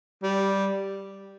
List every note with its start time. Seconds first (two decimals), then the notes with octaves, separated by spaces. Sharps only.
0.23 G3